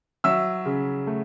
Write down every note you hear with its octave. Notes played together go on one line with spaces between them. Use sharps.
F#3 E5 E6
C#3
A3